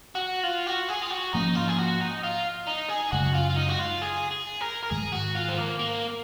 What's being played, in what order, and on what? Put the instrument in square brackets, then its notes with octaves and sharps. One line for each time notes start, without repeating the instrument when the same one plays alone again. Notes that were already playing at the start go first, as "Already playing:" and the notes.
[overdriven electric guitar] F#4
F4
F#4
G#4
F4
F#4
[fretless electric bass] G#2 F3 A#3 C#4 [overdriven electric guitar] D#4
[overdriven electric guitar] F4
G#4
F#4
D#4
F4
D#4
G#4
[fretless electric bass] F#2 C#3 G#3 [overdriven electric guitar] F#4
[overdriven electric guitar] F4
F4
D#4
F#4
F4
G#4
G#4
A#4
A#4
[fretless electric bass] G#2 D#3 G#3 [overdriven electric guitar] G#4
[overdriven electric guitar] F#4
F4
C4
A#3
A#3